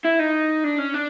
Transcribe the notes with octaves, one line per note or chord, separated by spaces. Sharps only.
E4
D#4
D4
C#4
D4